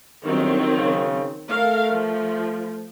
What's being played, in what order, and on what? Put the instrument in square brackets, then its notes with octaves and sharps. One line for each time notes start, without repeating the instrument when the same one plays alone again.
[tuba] G1 [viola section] D#3 F#3 C4
[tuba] C#3
[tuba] A3 [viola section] A4 A#4 F5
[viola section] F3